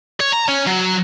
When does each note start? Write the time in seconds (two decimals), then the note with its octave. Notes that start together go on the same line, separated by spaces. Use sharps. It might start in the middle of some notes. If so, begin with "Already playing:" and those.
0.21 C#5
0.33 A#5
0.49 C#4
0.67 F#3